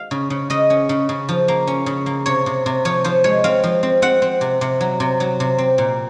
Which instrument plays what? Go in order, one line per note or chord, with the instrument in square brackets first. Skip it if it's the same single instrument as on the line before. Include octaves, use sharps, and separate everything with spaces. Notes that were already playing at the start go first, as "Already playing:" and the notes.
Already playing: [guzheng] F5
C#3
C#3
C#3 D#5
C#4
C#3
C#3
F3
A#3
C#4
C#3
A#3
C3 C#5
C3
C3
F3 C#5
F3 C5
G#3 C#5
C4 F5
F3
C4
C4 F#5
C4
C3
C3
F#3
C3
F#3
C3
C4
A#2